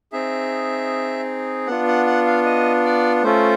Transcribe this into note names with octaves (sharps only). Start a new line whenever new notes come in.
C4 D#4 G#4 E5
B3 D4 F4 F#5
F#5
F#5
F5
D#5
D5
A3 C#4 F4 A4 C5